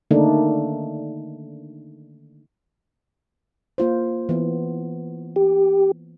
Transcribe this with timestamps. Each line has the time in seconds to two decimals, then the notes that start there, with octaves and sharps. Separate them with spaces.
0.11 D3 D#3 A3 A#3 D4 D#4
3.78 A#3 F4 C5
4.29 E3 B3
5.36 G4